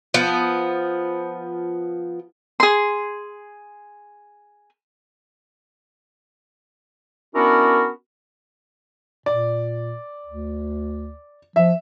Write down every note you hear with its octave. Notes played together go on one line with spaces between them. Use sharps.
F3 B3
G#4 C6
B3 C#4 D4 E4 F#4 A#4
A#2 D5
D2
F3 E5